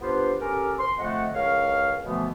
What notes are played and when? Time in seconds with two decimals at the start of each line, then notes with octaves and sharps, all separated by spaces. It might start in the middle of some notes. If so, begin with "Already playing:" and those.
0.02 B3 D4 F4 G4 B4 C5
0.40 C#4 G4 A4 A#4
0.79 C6
0.99 F2 D3 A3 D#5 F#5
1.35 C#2 A#4 C#5 F5
2.05 B2 D3 E3 F3 A3 B3